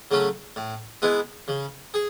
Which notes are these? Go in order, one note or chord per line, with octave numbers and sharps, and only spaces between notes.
C#3 F#3 A3 C#4
A2
G#3 B3 E4
C#3
G#4